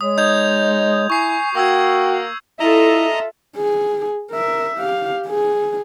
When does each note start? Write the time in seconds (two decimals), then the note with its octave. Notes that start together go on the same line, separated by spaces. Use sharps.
0.01 G#3 C#5 D#6
0.18 D#4 G6 G#6 F7
1.10 E4 G#5 C#6 C7
1.55 A#3 F#4 G5 C#6 E6 G#6
2.60 E4 F4 A4 D#5 E5 A#5 D#6
3.57 G#4
4.31 A#4 E5
4.77 G4 F5
5.28 G#4